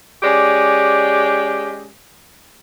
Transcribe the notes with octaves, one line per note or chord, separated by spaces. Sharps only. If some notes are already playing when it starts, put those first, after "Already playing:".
G#3 C#4 G4 D5